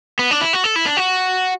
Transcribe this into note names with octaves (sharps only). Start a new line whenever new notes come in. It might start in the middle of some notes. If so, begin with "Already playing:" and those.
B3
D4
E4
F#4
A4
E4
D4
F#4